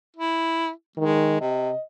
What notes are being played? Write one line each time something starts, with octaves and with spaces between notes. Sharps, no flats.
E4
D#3 G#3
C3 D#5